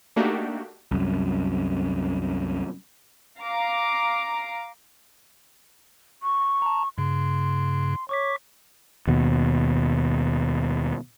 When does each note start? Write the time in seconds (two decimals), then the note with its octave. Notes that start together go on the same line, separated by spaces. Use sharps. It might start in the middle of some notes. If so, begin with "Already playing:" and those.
0.16 A3 A#3 D4 D#4 F#4 G4
0.91 C2 F#2
3.39 F5 A#5 D6
6.23 C#6
6.62 A5 A#5
6.98 G2 C#3 C6
8.09 C#5 C#6 D6 B6
9.07 D#2 B2